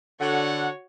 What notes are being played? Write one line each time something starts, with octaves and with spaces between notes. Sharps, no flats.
D3 F#4 C#5 F#5